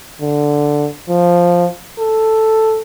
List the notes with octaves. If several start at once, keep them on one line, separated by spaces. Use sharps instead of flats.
D3
F3
A4